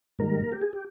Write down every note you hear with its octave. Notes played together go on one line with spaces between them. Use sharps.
G#2 D#3 G3 A#3 A#4
G4
G#4
G4